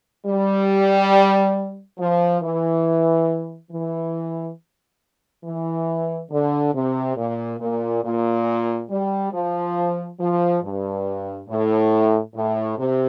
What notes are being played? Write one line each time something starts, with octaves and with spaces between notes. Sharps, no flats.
G3
F3
E3
E3
E3
D3
C3
A#2
A#2
A#2
G3
F3
F3
G2
A2
A2
C3